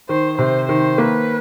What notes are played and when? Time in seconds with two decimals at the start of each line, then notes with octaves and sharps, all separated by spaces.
0.09 D#3 C5
0.38 C3 C5
0.68 D#3 C5
0.98 A#3 B4